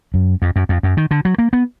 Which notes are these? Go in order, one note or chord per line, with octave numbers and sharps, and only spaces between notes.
F#2
F2
F#2
F2
F#2
D#3
D3
F#3
A#3
B3